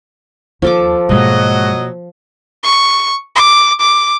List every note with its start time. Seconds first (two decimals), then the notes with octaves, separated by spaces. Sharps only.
0.62 D#2 F3 A4 D6
1.09 G#2 B2 F#3 G#3 A#3 F#4 D#5
2.64 C#6
3.35 D6
3.80 D6